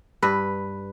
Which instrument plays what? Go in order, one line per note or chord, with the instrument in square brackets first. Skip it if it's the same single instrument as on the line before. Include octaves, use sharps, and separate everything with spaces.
[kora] G2 B4